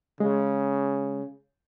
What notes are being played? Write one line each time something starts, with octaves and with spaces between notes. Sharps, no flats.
C#3 G#3